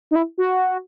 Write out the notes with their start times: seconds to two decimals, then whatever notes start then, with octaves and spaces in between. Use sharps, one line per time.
0.11 D#4
0.16 E4
0.38 F#4